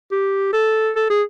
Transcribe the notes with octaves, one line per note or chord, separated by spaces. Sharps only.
G4
A4
A4
G#4